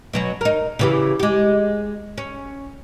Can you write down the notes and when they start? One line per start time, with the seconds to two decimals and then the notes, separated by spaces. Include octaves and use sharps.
0.13 B2 F#3 C#4
0.41 D#4 A#4
0.79 C#3 E3 G4
1.20 G#3 G4
2.18 C#4